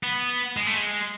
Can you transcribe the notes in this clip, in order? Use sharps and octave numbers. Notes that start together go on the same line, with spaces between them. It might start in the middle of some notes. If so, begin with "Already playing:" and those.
B3
G#3
A3
G#3